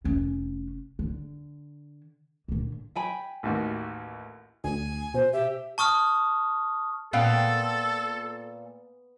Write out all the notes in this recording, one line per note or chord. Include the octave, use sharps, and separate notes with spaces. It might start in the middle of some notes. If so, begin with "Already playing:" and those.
F1 C#4
D3
A#2 D3
G5 G#5 B5
A1 D#2 F#4
D2 G#5
B2 C5
G4 E5
A5 C#6 D#6 F6
A#2 B3 F4 A4 F5 G5